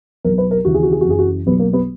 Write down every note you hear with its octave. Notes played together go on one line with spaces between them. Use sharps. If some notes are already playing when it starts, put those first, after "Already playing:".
B1 B2 F#3 A#4
B4
A#4
D#2 C#3 E3 F#4
G#4
F#4
G#4
F#4
F#1 F#2 E3 G#4
F#4
B1 B2 F#3 B3
A#3
B3